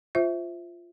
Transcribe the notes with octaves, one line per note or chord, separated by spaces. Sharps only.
F4 C5 E5